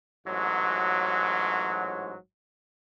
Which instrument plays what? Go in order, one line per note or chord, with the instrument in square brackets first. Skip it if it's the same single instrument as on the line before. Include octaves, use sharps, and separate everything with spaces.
[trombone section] A1 G#2 F#3